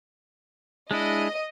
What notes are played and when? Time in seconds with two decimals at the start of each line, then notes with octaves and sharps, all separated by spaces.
0.91 G#3 D4 E4 D#5